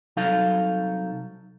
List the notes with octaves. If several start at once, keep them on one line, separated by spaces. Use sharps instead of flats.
C2 F#3 D#4 A4 F5